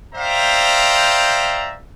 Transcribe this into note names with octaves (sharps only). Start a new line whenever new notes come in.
C5 D5 E5 F5 G5 A#5